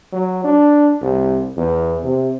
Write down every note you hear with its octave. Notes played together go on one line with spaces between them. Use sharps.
F#3
D4
C2
E2
C3